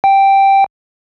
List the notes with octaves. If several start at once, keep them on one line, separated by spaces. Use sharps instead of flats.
G5